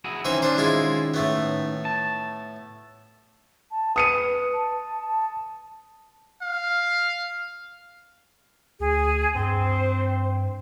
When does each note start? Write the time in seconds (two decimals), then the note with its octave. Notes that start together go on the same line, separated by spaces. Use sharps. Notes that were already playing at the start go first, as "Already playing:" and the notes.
0.04 E4 F#4 G#4
0.25 D#3 E3 C4 C#4 E5
0.42 D4 C5
0.58 G#3 E4 F4
1.14 A2 A3 B3
1.85 A5
3.71 A5
3.96 B4 D#6 C#7 D#7
4.52 A5
5.09 A5
6.42 F5
8.80 D2 G#4
9.35 G2 C4 C5